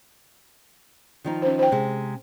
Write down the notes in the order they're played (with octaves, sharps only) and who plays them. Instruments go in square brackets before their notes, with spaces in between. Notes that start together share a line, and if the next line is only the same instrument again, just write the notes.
[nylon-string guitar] D#3 F3 D#4
[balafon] C#4 C5
C5 G5
[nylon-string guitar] C3 G#3